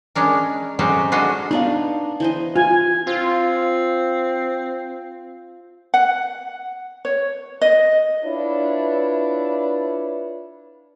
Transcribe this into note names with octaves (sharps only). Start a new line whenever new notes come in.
G#3 C#4 D4 A#4
F#3 G#3 C4 C#4 F#4 G4
G#3 D4 F4 F#4 D#5
B3 D4 D#4 A#4 F5
E3 C5 D#5
F4 G#5
C4 F4
F#5
C#5
D#5
D4 E4 F4 B4 C#5